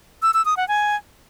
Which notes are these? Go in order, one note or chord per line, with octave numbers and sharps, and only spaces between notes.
E6
E6
D#6
F#5
G#5